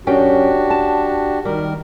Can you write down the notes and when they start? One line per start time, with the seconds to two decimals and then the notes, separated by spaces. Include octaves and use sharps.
0.07 F#2 C#4 D4 F#4 G4 G5
0.70 A5
1.45 D#3 G3 A#4